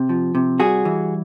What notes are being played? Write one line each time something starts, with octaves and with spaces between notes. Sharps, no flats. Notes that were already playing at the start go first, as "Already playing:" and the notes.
Already playing: C3
F3
C3
G3 F#4 G#4
E3